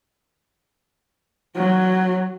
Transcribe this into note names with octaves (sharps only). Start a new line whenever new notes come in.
F#3